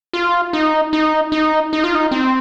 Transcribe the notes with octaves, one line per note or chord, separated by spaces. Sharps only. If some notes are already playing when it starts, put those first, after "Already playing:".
F4
D#4
D#4
D#4
D#4
F4
D#4
C4